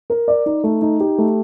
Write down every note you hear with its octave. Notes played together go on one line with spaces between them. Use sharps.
A#4
D5
D#4
A3
D#4
G4
A3